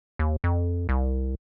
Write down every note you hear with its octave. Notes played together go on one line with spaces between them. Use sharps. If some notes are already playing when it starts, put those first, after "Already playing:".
D#2
F2
C2